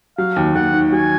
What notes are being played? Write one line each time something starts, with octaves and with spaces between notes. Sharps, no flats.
F#3 F5
D#2
D#2 F#5
D#3
F#3 G#5